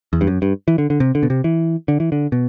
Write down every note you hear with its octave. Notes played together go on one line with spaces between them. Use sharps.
E2
G2
F#2
G2
E3
D3
D3
C3
D3
B2
C3
E3
D3
E3
D3
B2